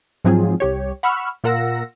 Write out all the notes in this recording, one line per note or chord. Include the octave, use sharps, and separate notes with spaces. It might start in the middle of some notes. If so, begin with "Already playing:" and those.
G#2 F3 F#3 C4 F4 G#4
C2 G4 C#5
F#5 B5 C#6 E6 F6
A#2 F4 A#4 F#5 E6 A#6